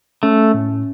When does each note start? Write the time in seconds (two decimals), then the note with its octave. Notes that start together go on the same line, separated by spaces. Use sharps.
0.23 A3 C#4
0.54 A2